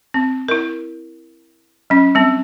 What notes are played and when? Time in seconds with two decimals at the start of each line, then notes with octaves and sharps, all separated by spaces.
0.14 C4
0.48 E4 A#4
1.90 F#3 C#4
2.15 G3 C4